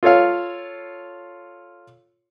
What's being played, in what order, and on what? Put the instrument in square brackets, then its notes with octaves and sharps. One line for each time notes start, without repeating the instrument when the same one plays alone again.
[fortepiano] F4 A4 C#5 F5